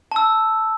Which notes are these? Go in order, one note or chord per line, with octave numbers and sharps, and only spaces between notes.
A5 E6